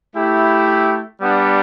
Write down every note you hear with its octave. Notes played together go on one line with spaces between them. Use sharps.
A3 E4 G4
G3 B3 D4